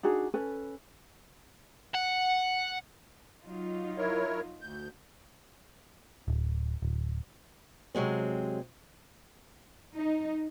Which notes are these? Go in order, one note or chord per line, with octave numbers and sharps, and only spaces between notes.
D4 D#4 F#4 G#4
C#4 A4 B4 G#5
F#5
F#3 D#4 F4
E4 A#4 C#5
D2 G6
D1
D1
C3 F#3 G#3 C4
D#4